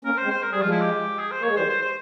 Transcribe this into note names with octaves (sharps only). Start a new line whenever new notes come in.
A#3 C#4 A#4
C5
G#3 C4
C5
A#4
G3 G#4
F3 G#3 F4
E4
G4
G#4
C5
A#3
G#3 C#5
E3 G3 C5
C5
C5